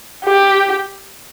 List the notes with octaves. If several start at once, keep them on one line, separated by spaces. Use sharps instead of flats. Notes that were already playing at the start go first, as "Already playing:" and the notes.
G4